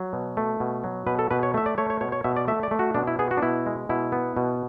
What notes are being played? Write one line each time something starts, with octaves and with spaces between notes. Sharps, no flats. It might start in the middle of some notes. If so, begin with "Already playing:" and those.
Already playing: F#3
B2
A3
B2
F#3
B2 B4
A4
B2 B4
C#5
A3 E5
D5
A3 C#5
C#5
B2 C#5
C#5
B2 E5
D5
A3 E5
D5
A3
F#4
B2 D4
E4
B3 G#4
F#4
D4
B2 E4
G#3
B2 E4
B3
B2